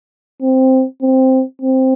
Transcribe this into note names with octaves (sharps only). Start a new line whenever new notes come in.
C4
C4
C4